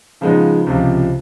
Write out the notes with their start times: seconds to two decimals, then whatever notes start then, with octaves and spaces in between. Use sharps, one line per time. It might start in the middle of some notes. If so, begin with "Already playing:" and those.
0.21 C#3 F3 G#3 B3 D#4
0.67 C#2 C3 F3